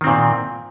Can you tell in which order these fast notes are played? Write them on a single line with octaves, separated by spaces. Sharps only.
D#3 C4 A#2